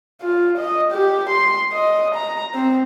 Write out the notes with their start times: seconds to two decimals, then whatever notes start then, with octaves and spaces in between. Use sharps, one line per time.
0.21 F4
0.57 D#5
0.92 G4
1.29 C6
1.73 D#5
2.15 A#5
2.54 C4